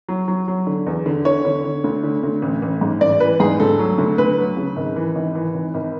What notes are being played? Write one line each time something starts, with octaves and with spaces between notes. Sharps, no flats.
F#3
F#3
F#3
D3
E2
D3
D3 C#5
D3
D3
D2
D3
D2
A1
A1
G#2
A1 D5
E3 B4
G#2 G#4
D2 A4
F#3
D2
D2 B4
F#3
C#3
G#1
E3
G#1
E3
G#1
G#1